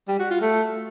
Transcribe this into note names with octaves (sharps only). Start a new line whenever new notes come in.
G3
F#4
F4
A3